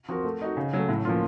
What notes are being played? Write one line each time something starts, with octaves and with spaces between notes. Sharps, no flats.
F3 C4 F#4 A#4
A3
D#4 F#4
C#3
F#3 A3
A2
F3 A#3 C#4 F4